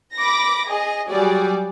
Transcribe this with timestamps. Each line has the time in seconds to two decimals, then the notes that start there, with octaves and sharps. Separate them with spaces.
0.16 B5 D6 A#6
0.68 G#4 D#5
1.10 F#3 G3 F#4 G#4 D5